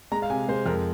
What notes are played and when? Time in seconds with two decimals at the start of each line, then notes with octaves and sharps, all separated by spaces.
0.12 G#3 A#5
0.22 F5
0.30 C3 G#5
0.48 G#3 C5
0.66 F2 A#4